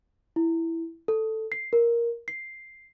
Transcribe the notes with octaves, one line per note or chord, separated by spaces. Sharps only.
E4
A4
C7
A#4
C7